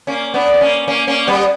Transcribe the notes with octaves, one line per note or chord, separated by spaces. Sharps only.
A#3 C#4
B3 D4
B3
A#3 C#4
A#3 C#4
A#3 C#4
G3 B3